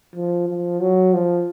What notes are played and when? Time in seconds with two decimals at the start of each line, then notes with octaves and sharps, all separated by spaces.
0.16 F3
0.48 F3
0.81 F#3
1.13 F3